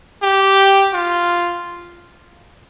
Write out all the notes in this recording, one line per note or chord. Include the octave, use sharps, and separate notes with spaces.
G4
F4